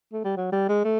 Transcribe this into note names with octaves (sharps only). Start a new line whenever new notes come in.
A3
G3
F#3
G3
G#3
A3